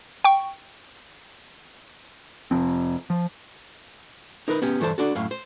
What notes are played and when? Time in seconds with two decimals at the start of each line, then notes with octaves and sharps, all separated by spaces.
0.24 G5 C#6
2.51 F1 F3 C4
3.10 F3
4.48 D#4 A#4 B4
4.62 B3 C#4 G4
4.81 G2 E3 A4 C5 A5
4.98 D4 F#4 A4
5.15 F#2 A2 F5
5.31 C5